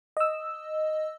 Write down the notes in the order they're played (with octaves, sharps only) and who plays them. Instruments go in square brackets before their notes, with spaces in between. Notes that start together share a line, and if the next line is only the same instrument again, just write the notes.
[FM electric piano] D#5 E6